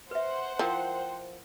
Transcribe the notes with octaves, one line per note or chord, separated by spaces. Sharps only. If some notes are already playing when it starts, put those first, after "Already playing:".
B4 C5 E5 F#5
F3 E4 A#4 G5